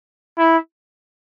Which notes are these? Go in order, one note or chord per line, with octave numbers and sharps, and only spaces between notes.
E4